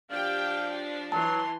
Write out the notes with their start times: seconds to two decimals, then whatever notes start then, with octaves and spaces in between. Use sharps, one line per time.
0.11 F3 D4 G4 F5 G5
1.12 E3 F#3 A5 C6